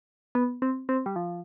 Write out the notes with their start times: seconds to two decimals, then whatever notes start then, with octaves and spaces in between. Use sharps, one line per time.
0.35 B3
0.62 C4
0.89 C4
1.06 G3
1.16 F3